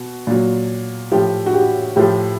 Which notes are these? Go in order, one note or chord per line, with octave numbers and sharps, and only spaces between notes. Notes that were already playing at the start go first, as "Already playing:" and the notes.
Already playing: B2
A#2 F#3
A2 F3 G4
F#4
G4
A2 F3 G4